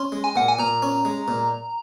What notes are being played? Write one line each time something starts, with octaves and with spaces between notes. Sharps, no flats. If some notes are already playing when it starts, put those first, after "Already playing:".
Already playing: C#4 C6
G#3
G#5
A#2 F#5
G#5
A#2 A#5
C#4
G#3
A#2